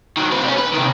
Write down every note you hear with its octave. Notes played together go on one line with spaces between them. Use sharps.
D#3 F#3
C4 B4
G3 C#4
B4
C3 D#3